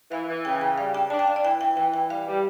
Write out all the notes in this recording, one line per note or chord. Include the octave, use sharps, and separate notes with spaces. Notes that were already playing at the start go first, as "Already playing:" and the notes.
E3 F5
E3
C#3 G5
C#3 G5
G3 F5
D4 G5
D4 A5
G5
D4 F5
D5
E3 G5
E3 G5
E3 G5
E3 G5
G3 F5
G3